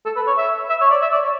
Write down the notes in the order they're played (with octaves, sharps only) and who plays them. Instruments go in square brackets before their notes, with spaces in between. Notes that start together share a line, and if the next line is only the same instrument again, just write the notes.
[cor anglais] A4
B4
C#5
E5
E5
C#5
D5
E5
D5
C#5